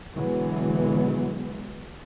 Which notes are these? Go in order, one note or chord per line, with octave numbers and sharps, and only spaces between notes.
B2 D3 E3 F#3 G#3 B3